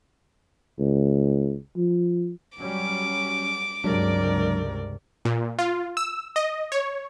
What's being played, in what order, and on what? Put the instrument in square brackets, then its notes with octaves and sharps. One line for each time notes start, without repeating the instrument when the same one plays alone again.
[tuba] C#2
F3
[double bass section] F#3 G3 C#4 [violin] D6
[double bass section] C#2 G2 C3 [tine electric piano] F#3 G#3 D4 [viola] A#4 D5
[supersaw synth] A#2
F4
E6
D#5
C#5